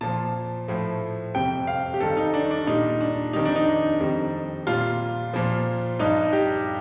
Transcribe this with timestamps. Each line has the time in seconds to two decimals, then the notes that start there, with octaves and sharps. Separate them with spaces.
0.01 A#2 F3 A5
0.68 A2 F3
1.35 F2 C3 G3 G5
1.67 F5
1.94 G4
2.00 G2 D#3 G3 A4
2.17 D#4
2.34 D4
2.51 D4
2.67 A#2 G3 D#4
3.01 D4
3.33 F2 D#3 G3 D#4
3.45 D4
3.56 D#4
4.00 F2 D#3 G3
4.67 A#2 G3 F4
5.33 A#2 F3
5.99 G2 F3 D#4
6.33 G4